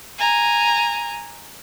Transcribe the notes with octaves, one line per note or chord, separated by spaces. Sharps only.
G#5 A#5